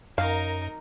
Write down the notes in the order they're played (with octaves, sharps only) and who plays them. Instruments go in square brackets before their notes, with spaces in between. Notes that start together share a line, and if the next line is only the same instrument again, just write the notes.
[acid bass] F#2 [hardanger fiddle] D#4 A#4 [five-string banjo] F5